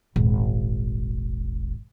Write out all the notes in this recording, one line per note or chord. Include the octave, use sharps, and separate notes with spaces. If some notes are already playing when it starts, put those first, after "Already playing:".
D#1 G#1